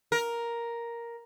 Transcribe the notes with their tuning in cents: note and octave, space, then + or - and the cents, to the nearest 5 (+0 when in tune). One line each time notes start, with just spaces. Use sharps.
A#4 +5